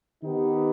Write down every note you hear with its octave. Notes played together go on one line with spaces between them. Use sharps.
D#3 B3 D#4 G4